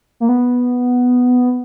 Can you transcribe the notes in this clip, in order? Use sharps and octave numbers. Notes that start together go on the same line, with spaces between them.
A#3
B3